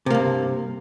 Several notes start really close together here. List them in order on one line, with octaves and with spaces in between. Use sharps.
C3 A#3 G2